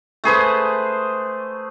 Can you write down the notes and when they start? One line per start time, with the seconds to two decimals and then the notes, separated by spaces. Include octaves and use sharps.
0.24 A3 G#4 B4 C5